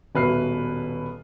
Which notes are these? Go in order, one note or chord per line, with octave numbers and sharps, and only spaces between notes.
D#1 B2 B4 E5 F6 C7